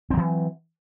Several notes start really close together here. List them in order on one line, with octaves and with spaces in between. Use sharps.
C4 F#3 E3